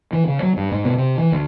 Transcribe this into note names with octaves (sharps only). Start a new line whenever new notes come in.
E3
C#3
F#3
G2
G#2
B2
C3
E3
D2